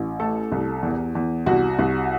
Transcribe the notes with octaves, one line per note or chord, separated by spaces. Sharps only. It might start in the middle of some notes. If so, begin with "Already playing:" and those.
Already playing: A1
A3 A4
C2
E2
E2
C2 F#4
C2